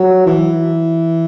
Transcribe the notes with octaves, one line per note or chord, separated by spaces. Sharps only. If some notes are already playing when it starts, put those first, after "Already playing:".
Already playing: F#3
E3